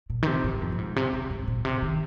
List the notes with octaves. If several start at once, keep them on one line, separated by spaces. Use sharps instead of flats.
A#2
D#3
C3
G#2
F2
A#2
G#2
C3
C3
G#2
A#2
C3
D#3